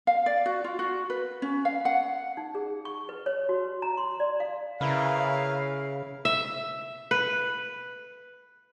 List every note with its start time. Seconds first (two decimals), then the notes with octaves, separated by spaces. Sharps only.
0.07 F5
0.26 D5
0.46 F#4
0.64 F4
0.79 F#4
1.10 B4
1.42 C#4
1.65 F5
1.85 F#5
2.37 D#4
2.55 G#4
2.85 C#6
3.09 B4
3.26 C#5
3.49 F#4
3.82 A#5
3.97 C6
4.20 D5
4.40 F5
4.81 C#3 E4 A#4 B4 F5
6.25 E5
7.11 B4